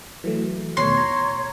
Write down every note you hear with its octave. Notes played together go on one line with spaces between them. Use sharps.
E3 F#3 A3
D#2 B2 A3 C#5 C6
A#5